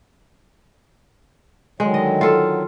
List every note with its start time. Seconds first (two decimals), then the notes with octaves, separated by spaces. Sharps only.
1.80 D3 D#3 F#3 G#3
1.94 D#5
2.21 F4 A4